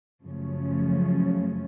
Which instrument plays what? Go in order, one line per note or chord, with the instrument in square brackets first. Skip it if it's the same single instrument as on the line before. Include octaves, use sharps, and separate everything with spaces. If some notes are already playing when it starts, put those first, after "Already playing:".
[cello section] F#2 C#3 F3 A3 C#4